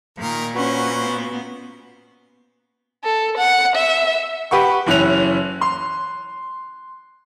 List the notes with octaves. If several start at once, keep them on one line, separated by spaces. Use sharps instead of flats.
A#2 D#3 A#4
C#4 F#4 B4 C5 F#5
B3
A4
F#5
E5
G4 B4 F#5 C#6
F#1 E3 C#4 F#6 F7
C6